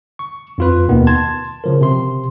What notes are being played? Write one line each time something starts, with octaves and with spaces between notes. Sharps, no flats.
C#6
F2 F4 B4
D#2 B2 D#3 B3
A5 C6 G#6
C#3 F3 A#4
C3 C6